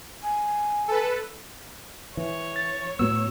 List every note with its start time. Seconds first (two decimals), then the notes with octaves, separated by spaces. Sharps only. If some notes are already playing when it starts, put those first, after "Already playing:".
0.23 G#5
0.88 A4 B4
2.17 E3 C#5
2.56 A6
2.99 A2 B3 F#4 E6